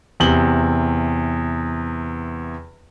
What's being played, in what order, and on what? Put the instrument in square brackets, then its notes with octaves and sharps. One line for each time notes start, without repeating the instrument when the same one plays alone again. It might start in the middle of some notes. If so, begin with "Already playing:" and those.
[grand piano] E2 C3 F#7 G7